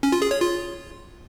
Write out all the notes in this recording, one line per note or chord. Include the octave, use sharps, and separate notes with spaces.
C#4
F4
G#4
C#5
F4